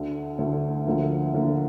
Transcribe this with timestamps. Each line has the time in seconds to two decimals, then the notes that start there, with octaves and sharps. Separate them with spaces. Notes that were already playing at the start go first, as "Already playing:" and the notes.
Already playing: D2 D3 A3
0.38 D2 D3 A3
0.86 D2 D3 F3 A#3
1.34 D2 D3 F3 A#3